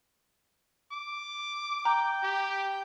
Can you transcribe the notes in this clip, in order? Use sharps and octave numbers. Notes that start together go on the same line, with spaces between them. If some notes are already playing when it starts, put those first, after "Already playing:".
D6
G5 A#5
G4